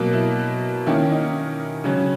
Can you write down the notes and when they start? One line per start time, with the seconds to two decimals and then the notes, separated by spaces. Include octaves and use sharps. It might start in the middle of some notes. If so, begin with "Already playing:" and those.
Already playing: B2 F#3 A#3
0.13 E4
0.87 D#3 A#3 C#4 E4
1.11 D#4
1.84 C#3 F#3 C#4